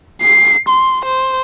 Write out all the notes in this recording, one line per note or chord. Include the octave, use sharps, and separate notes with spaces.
C7
C6
C5